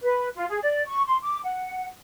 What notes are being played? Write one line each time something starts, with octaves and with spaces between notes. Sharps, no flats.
B4
F4
G#4
D5
C#6
C6
D6
F#5